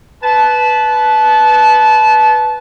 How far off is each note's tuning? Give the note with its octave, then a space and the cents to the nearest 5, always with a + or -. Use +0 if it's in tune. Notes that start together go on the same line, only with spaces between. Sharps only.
B4 +0 A5 -20